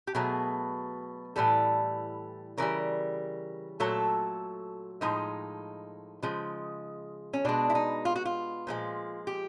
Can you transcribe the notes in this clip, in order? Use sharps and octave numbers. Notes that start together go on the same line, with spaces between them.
G4
B2 F#3 A3 G#4
A2 E3 G3 A4
C#3 E3 G3 A#4
A#2 F#3 A3 A4
A2 F3 G#3 D#4
C#3 F3 G#3
C#4
B2 G#3 D4
E4
D#4
F4
F#4
F4
A#2 F3 G#3
G4